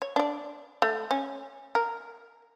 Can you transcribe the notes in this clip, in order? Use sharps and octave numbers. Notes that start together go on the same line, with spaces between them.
C#5
D4 D5
A3
C#4
A#4